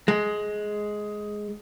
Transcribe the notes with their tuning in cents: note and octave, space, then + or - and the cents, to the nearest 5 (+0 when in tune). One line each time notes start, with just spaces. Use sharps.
G#3 +10